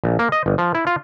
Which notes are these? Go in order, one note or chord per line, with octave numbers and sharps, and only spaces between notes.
A#1
A#3
D#5
G1
F3
E4
F4